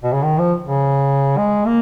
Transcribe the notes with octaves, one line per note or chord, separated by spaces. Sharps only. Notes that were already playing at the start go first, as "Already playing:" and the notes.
B2
C#3
D#3
F3
C#3
G#3
A#3